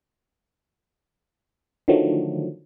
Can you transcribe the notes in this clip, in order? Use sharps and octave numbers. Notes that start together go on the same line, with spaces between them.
D3 D#3 F3 F#3 A3